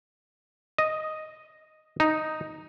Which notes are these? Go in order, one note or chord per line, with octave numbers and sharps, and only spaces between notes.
D#5
D#4